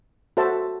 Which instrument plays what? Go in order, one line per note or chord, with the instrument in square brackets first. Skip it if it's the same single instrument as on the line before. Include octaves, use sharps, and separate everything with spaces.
[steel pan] F#4 A4 C5 E5 A5